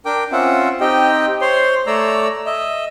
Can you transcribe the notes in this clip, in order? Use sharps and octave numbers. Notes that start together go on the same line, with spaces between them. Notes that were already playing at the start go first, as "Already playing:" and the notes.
D4 A#4 G5 D6
C4 C#4 F4 E5 F#5
C4 D#4 G4 D#5 G5
C5 C#5 C6
A3 C#5 D5 A#5 E6
D#5 E5